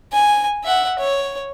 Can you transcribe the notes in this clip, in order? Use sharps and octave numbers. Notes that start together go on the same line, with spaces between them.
G#5
E5 F#5
C#5